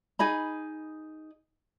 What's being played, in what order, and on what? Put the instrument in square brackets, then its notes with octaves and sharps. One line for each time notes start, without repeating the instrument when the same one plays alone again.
[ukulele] D#4 G#4 D#5 B5